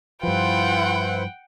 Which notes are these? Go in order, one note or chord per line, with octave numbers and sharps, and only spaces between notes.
G2 F3 E4 F4 B4 C5 F#5 G5